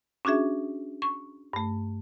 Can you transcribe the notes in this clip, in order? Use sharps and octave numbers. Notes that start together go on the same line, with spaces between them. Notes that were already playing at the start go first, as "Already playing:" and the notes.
C#4 D4 F#4 G#4 E5
C#6
G2 A3